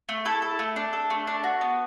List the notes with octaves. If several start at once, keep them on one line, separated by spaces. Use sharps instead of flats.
A3
E4 A4
A4
A3
D4
A4
A3
D4
F#4
B3